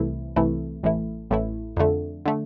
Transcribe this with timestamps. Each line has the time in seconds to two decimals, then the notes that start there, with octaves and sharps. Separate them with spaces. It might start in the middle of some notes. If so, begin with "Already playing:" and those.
Already playing: C2 C3 E3 A3 E4
0.36 C2 C3 E3 A3 E4
0.83 A1 A2 E3 A3 E4
1.30 A1 A2 E3 A3 E4
1.77 F2 D3 A3
2.26 D3 A3